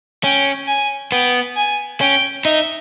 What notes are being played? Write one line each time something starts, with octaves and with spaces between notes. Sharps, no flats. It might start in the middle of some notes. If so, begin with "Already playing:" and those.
C#4 G5
G#5
B3 G5
G#5
C#4 G5
D#4 E5